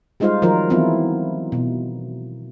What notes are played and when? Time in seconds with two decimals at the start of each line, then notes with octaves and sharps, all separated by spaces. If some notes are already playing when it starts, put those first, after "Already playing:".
0.20 G3 G#3 D#4 F4 C5 F5
0.42 D#3 F3 F#3 F4 A#4
0.70 E3 F#3 B3 C4 E4 F4
1.52 B2